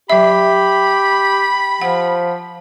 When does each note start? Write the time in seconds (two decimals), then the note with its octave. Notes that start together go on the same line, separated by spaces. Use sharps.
0.10 F#3 G4 E5 B5
1.81 F3 F#5